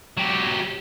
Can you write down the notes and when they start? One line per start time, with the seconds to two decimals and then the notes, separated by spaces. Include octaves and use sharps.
0.17 F#3 G4